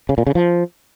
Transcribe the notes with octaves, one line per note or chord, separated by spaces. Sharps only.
C#3
A#2
C#3
F3